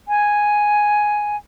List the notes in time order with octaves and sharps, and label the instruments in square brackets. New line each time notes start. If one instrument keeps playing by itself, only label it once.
[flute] G#5